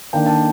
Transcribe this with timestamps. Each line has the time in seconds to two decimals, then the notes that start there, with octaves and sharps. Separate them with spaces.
0.13 D#3 A#3 D4 G5
0.26 A5